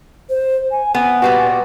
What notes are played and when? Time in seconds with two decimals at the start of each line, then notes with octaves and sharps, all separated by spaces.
0.30 C5
0.71 G#5
0.95 B3 G#5
1.22 A#2 G3 F#4 B4